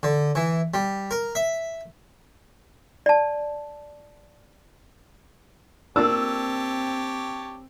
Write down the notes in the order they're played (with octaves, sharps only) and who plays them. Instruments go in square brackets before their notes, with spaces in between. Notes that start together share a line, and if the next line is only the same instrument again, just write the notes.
[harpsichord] D3
E3
G3
A#4
E5
[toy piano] D5 A5
[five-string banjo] A#3 D4 [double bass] C4 [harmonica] G4 C#5 A5 [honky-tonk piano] E6